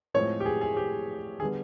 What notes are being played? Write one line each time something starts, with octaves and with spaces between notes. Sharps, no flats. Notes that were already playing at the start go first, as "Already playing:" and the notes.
A2 F3 G#3 C4 C#5
G4
G#4
G#4
G4
D3 G3 B3 G#4